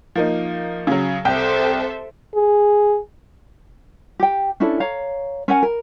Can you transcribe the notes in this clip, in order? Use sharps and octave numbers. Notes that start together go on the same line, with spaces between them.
F3 A#3 D#4
C#3 F#3
C2 A4 C5 E5 G5
G#4
G4 G5
C#4 D4 E4 A4
C#5 F5 A#5
C#4 A#4 F#5 G#5
A#4